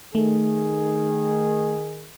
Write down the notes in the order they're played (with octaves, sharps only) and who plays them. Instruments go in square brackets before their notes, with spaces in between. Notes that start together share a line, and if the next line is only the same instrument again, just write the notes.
[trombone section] D#3 G#4 [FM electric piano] A3